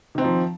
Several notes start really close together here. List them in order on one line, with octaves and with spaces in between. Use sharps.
D#3 C4 D#4 F3